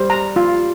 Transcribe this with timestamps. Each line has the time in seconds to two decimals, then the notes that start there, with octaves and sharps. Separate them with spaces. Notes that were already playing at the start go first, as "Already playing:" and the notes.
Already playing: G3 C5
0.10 A#5
0.36 F4